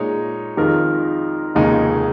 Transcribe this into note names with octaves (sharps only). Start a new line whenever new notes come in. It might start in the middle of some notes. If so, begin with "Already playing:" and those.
Already playing: A#2 G#3 D#4 C#5
F2 D#3 G#3 F4 A#4
F1 D#2 C#3 G#3 D#4